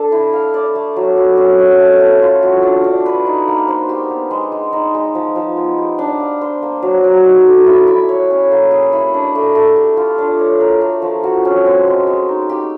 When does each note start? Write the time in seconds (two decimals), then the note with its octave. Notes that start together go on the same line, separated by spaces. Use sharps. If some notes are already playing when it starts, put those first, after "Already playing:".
Already playing: D4 A4
0.12 E4
0.33 F5
0.54 D5
0.75 A3
0.96 F#3
1.17 F#4
1.37 C#4
1.59 C#4
1.80 A3
2.00 A4
2.22 F4
2.43 F#4
2.63 D4
2.84 D4
3.06 B4
3.26 D#4
3.48 A#3
3.68 C5
3.89 G4
4.10 B3
4.31 G#3
4.52 G#3
4.73 D#4
4.95 G#3
5.15 F3
5.36 F3
5.57 B3
5.78 G4
5.99 D4
6.20 F5
6.41 C5
6.62 A#3
6.82 F#3
7.04 F#3
7.25 D#4
7.47 A4
7.66 E4
7.87 E4
8.09 C#5
8.30 C#4
8.51 A#3
8.71 G#4
8.93 E4
9.14 D4
9.35 A3
9.55 A3
9.76 G4
9.97 F4
10.18 D4
10.39 C#5
10.61 A#4
10.81 A3
11.02 F3
11.24 F#4
11.45 C#4
11.66 C4
11.87 G#3
12.07 G#3
12.29 D#4
12.49 G4